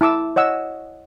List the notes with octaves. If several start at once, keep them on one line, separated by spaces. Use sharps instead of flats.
E4 A5 D6 E6
C#5 D#5 F#5 E6